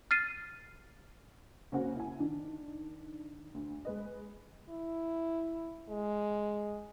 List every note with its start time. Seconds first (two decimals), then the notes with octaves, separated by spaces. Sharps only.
0.11 F6 A6 C7 D#7
1.72 C#3 A#3 C4 C#4 F#4
1.96 E4 G#5
2.19 D#3 D4
3.54 D2
3.85 G#3 B4 D#5
4.69 E4
5.89 G#3